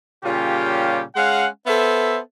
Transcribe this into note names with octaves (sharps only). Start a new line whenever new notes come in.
A#2 C#3 G3 C#4 F4 G4
G#3 C#4 F5 F#5
B3 A4 C5 E5